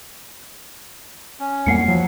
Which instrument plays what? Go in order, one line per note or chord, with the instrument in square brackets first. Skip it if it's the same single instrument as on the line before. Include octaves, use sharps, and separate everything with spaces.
[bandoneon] C#4
[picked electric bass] F2 G3 A#3 [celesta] F#5 C7 C#7
[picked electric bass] F3 [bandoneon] F#3